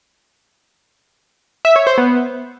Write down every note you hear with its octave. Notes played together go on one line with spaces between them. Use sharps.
E5
C#5
C5
B3